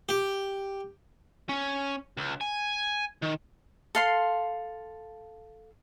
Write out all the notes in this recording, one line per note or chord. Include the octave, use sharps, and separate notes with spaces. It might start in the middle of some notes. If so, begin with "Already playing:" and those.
G4
C#4
C#2
G#5
D#3
A4 F5 C6